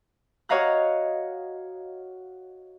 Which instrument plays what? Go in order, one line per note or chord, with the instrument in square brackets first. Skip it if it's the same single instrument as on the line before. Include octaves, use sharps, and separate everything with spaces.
[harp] F#4 C#5 D#5 F5 A#5 F#6